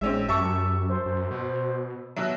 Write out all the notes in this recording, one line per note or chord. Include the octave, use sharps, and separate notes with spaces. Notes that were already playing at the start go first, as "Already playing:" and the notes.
A1 G#3 C4 C#4 E5
F#2 G4 E5 A5 C#6
C5
F#2
B2
B2 F#3 E5